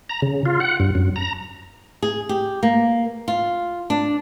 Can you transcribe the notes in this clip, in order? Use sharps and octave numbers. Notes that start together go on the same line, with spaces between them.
A#5
C#3
F4
F#5
G2
F#2
A#5
G#4
G4
A#3
F4
D4